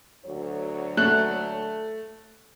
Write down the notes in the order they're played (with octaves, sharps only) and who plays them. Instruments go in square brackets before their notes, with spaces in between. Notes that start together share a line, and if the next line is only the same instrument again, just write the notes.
[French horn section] D2 F#3 C#5
[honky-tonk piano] A3 F#6